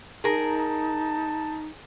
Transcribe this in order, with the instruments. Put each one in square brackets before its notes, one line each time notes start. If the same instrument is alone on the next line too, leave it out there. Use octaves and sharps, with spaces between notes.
[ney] D#4 [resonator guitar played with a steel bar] G#4 A#4 [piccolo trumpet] A5